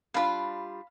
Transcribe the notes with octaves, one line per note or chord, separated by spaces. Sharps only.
G3 D4 F4 F5 B5